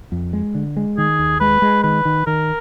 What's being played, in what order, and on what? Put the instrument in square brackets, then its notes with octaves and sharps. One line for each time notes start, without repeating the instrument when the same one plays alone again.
[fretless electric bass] F2
G#3
D3
G#3
[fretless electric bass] D#3 [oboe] G#4
[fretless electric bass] D#2
[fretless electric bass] G#3 [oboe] B4
[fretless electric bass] G#3
[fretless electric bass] D#3 [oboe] B4
[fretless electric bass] D#3
[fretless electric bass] D#3 [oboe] A#4